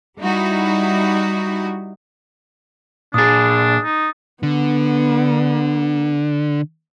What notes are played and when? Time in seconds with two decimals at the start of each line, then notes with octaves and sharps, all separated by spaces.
0.20 G3 D#4 E4 F#4
3.14 A#2 D4 G#4 D#6 A6
3.84 D#4
4.43 D3 B3